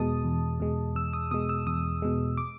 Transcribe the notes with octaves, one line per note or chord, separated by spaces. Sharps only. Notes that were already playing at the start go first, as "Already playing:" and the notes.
Already playing: E2 B2 G#3 A5 D#6
E2
B2 G#3
E2 E6
D#6
B2 G#3 D#6
E6
E2 D#6
B2 G#3
D6